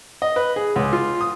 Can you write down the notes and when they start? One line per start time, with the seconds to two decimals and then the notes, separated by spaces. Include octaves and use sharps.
0.22 D#5
0.36 B4
0.56 G#4
0.76 C#2
0.93 F4
1.21 D#6